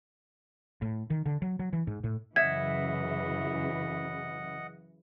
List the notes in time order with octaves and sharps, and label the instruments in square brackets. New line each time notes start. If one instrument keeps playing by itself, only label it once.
[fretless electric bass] A2
D#3
D3
F#3
F#3
E3
G#2
A2
[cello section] F#2 C#3 E3 [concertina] D#5 F#5 [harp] E5 [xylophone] G#6